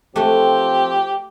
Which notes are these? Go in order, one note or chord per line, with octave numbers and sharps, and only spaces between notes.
F3 A3 C4 F#4 G4